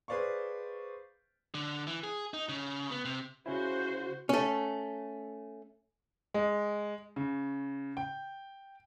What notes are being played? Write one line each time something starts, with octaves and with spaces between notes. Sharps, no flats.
G#4 B4 C5 D5 F5 C#6
D3
E3
G#4
D#4
C#3
B3
C3
C#3 C#4 E4 F#4 C5
A3 C#4
G#3
C#3
G5